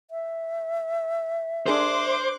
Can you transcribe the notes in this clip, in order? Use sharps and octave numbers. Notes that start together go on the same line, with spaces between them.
E5
D4 G#4 A#4 C5 C6 D6 F#6